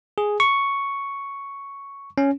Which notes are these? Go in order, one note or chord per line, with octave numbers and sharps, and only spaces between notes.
G#4
C#6
C#4